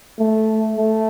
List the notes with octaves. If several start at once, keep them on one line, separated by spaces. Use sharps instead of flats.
A3
A3